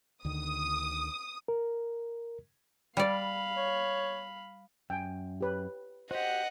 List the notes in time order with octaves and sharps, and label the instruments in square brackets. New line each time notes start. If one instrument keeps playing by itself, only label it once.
[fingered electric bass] D2 D3 D#3 [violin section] D#6
[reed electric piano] A#4
[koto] G3 D5 [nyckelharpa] F5 B5
[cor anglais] C#5
[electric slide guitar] F#2 [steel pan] G5 G#5
[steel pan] G4 B4 C#5
[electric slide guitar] F#4 G4 [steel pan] C5 [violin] D#5 F#5